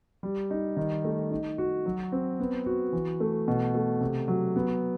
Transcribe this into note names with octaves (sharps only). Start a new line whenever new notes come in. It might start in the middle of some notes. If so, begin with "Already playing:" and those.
G3
D#4
D#3
A3
D#4
F#4
F#3
C4
B3
F#4
E3
A3
B2
A3
C3
F#3
B3